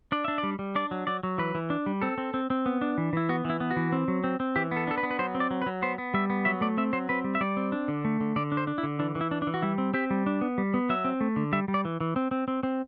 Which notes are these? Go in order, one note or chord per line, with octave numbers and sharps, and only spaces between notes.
D4 D5
D4 E5
D5
G3
G3
D4 D5
F#3
F#3 D5
F#3
E3 B4
E3
D4
G3
C4 A4
C4
C4
C4
B3
D4
E3
E3 E4
B3 F#4
E3
E4
B3
F#4
E3
C4
F#3
C4
C4
E3 G4
B3
A4
D4 A4
B4
B3
B4
F#3 C5
C4
D5
F#3
B4
F#3
B3 C5
B3
G3 E5
B3
F#3 E5
A3 D5
C4 E5
F#3 C5
C4 B4
G3
E5
G3 D5
C4
D4
D3
A3
D3
D3 D5
D4
C5
D4
E4
D3
E3 D4
E3
E4
D4
D4
E3
F#4
G3 E4
C4
C4 G4
G3
D4
B3
G3
B3
F#3 E5
C4
A3
D3
G3 E5
G3
D5
E3
E3
C4
C4
C4
C4